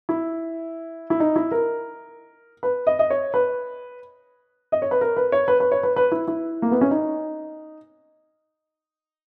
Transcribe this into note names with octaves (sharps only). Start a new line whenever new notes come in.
E4
E4
D#4
E4
A#4
B4
D#5
D#5
C#5
B4
D#5
C#5
B4
A#4
B4
C#5
B4
B4
C#5
B4
B4
E4
E4
A#3
B3
C#4
D#4